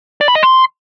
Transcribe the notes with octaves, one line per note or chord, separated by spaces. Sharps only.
D5
B5
D#5
C6